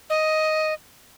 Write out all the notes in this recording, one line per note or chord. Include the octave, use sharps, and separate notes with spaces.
D#5